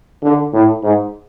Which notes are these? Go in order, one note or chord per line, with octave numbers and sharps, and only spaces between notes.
D3
A2
G#2